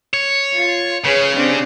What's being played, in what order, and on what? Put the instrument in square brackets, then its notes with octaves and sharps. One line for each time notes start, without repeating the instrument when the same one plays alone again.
[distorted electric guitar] C#5
[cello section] F4
[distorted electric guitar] C#3 [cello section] G#4 B4 C#5
[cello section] C4 D4 G4